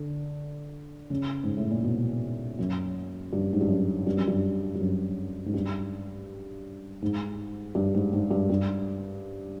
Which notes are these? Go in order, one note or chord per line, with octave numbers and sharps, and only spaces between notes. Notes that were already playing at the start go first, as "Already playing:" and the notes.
Already playing: D3
C#3
G#2
A2
A#2
B2
F#2
G2
G#2
G2
F#2
G2
F#2
G2
G2
F#2
G#2
G2
G#2
G2
G#2
G#2
G2
G2